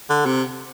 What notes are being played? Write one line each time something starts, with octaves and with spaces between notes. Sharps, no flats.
D3
C3